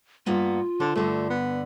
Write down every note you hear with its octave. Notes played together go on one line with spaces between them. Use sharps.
G2 A#3 B3 F4
D3 C5
G2 D3 A3
B3